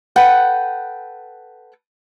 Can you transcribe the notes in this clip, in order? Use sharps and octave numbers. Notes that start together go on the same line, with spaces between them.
A4 B4 F#5 G5